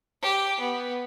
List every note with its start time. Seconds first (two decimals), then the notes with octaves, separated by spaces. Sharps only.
0.22 G4
0.59 B3